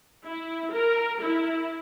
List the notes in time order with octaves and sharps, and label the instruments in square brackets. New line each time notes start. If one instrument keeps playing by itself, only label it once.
[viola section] E4
A#4
E4